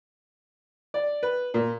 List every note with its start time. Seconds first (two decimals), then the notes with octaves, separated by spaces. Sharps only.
0.94 D5
1.23 B4
1.54 A#2